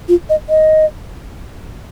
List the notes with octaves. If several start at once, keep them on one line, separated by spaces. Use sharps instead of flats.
F4
D#5
D#5